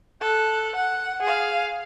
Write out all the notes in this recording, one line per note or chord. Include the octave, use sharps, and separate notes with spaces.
A4 F#6
F#5
G#4 F5